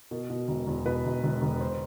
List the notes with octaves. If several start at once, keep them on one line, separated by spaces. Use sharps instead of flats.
B2 A#4
B2
E1
E2
B2 B4
E1
E1
E1
C5